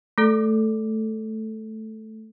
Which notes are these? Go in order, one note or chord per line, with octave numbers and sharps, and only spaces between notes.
A3 A4